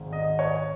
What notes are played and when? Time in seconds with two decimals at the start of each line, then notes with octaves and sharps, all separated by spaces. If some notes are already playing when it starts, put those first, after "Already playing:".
Already playing: G#1 G#2 D#3
0.13 D#5
0.39 C#5